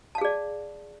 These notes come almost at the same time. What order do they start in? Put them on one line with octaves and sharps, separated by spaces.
A5 F5 G#4 D5